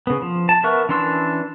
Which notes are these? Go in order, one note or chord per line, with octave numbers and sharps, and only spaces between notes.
C#3 B3
F3
A5
B3 A#4 E5 C#6 F#6
E3 C#4 D4 C6 E6